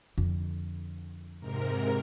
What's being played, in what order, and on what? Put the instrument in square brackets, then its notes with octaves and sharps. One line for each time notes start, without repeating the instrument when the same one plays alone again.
[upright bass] F2 D3
[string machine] G#2 C3 A#4